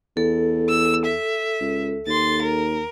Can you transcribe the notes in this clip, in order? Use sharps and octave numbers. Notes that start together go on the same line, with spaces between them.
E2 A4
E6
E5
C#2
D#2 C6 A6
A#4